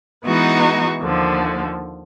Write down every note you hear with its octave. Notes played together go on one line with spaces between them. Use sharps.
E3 G#3 B3 D#4 F#4
D#2 D3 F3